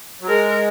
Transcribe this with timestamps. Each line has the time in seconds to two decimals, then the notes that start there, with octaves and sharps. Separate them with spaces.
0.21 F#3
0.27 G#3 A#4